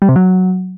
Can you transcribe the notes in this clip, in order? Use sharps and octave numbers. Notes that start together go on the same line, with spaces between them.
G3
C3
F#3